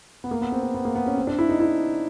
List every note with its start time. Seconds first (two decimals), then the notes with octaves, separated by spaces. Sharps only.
0.24 B3
0.31 A#3
0.41 B3
0.52 C4
0.63 C4
0.74 B3
0.85 A#3
0.95 B3
1.06 C#4
1.17 C4
1.27 D4
1.39 E4
1.49 D#4
1.60 E4